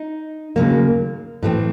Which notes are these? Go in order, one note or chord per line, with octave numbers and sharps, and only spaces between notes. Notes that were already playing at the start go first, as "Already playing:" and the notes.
Already playing: D#4
D#2 C#3 F#3 A#3
A2 E3 A3 C4